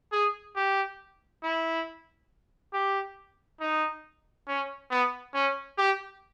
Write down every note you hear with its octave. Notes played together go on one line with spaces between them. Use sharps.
G#4
G4
E4
G4
D#4
C#4
B3
C#4
G4